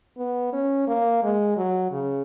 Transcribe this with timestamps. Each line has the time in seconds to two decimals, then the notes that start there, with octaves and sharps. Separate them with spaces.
0.18 B3
0.53 C#4
0.87 A#3
1.23 G#3
1.57 F#3
1.92 C#3